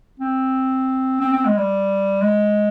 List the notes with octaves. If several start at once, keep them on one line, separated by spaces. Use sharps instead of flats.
C4
C4
C4
G#3
G3
G#3